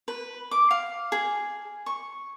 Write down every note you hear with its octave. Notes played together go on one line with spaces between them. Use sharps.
B4
D6
F5
G#4
C#6